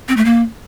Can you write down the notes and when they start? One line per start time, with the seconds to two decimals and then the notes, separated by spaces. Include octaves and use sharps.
0.08 C4
0.17 A3
0.25 A#3